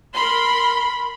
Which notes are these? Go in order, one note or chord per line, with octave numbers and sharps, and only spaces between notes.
A#4 B5 C6